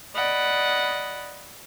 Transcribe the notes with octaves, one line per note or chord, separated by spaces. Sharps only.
D5 D#5 F#5 B5